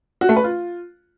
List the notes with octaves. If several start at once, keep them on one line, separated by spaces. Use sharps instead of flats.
F#4
A3
B4
F4